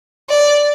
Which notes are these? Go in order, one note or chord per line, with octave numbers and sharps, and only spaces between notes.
D5